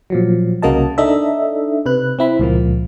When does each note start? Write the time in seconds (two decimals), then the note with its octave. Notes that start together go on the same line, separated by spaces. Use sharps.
0.10 A#2 F3 F#3
0.62 C2 C#3 A#3 F#4 D#5 A5
0.98 D4 D#4 A4 D#5 E5
1.86 C3 B4 F#6
2.19 C4 E4 B5
2.39 C#2 A#2 F3 A#3